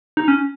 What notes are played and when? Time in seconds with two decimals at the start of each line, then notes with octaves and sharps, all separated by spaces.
0.17 D#4
0.28 C#4